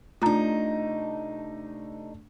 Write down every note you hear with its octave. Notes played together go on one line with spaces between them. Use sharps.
C3 A3 D4 D#4 F4 A#5